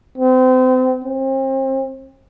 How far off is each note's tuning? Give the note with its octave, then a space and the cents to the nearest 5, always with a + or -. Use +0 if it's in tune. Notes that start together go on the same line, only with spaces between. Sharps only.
C4 -30
C4 +35